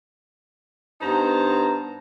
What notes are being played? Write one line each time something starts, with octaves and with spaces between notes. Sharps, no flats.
G2 B3 D#4 C5 A5 A#5